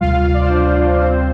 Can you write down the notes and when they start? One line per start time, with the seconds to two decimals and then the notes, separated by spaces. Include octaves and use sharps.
0.01 D2 C3 G3 F4 F5
0.26 F5
0.34 D5
0.42 C5
0.50 D4 D5
1.00 C4 C5